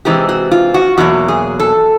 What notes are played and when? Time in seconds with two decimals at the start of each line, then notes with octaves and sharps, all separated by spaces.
0.05 C3 E3 G#3 C4 G4
0.29 F#4
0.51 F4
0.74 F#4
0.97 E2 B2 F#3 A#3 F#4
1.28 G#4
1.60 A4